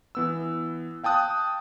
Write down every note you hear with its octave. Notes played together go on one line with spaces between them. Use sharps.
E3 B3 E6
F5 G5 A5 D#6 F#6